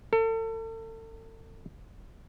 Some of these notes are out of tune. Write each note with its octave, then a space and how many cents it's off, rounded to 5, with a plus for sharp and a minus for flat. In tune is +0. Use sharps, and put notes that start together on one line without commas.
A4 +35